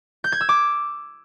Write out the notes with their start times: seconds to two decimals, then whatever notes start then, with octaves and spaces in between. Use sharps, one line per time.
0.24 G6
0.32 G#6
0.41 E6
0.49 D6